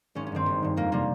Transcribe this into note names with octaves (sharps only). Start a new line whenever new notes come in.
G#1 C#4
C#4
G2 D#3 C4
G#1
G2 D#3
F2 A#3
C3 G3 A#3